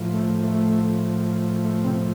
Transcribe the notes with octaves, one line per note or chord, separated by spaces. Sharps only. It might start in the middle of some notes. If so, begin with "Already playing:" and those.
Already playing: A2 F3
A3
A3
A3
C3 C4